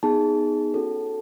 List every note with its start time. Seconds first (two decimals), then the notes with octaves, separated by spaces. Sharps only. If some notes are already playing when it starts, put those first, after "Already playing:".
0.03 B3 D#4 G#4 A5
0.74 C#4 F#4 A4